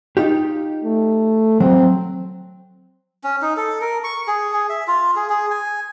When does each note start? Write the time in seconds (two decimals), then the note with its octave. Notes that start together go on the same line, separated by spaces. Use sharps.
0.17 D#4 F4 G4
0.84 A3
1.61 F#3 C4
3.24 C#4
3.42 D#4
3.57 A4
3.81 A#4
4.04 C#6
4.27 G#4
4.53 G#4
4.69 E5
4.87 F4
5.16 G#4
5.29 G#4
5.51 G#5